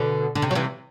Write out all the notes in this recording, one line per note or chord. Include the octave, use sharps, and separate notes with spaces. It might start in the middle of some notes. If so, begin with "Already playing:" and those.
Already playing: B2 D3
D3
C3
F#3
C3 E3